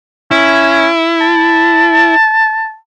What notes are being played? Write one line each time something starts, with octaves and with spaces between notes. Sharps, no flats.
C#4 E4
A5